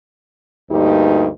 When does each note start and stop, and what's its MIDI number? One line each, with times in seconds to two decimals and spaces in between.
0.70 1.29 38
0.70 1.29 43
0.70 1.29 58
0.70 1.29 63
0.70 1.29 67